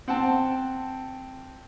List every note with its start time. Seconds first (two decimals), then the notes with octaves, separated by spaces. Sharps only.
0.08 C4 F#5 G5 A5